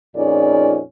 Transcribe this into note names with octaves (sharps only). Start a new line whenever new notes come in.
F2 A#2 C#4 D#4 G#4 D5